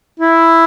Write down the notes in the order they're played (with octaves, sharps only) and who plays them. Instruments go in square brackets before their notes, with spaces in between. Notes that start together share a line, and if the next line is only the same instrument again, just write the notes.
[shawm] E4